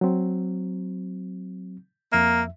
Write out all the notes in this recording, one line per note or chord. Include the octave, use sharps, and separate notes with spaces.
F#3 C4
F2 A#3 E5